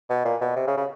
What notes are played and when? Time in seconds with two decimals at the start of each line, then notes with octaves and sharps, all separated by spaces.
0.10 B2
0.25 A#2
0.41 B2
0.56 C3
0.67 C#3
0.78 C#3